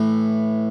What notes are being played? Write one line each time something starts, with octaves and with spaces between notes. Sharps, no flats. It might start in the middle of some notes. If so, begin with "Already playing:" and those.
Already playing: A2 E3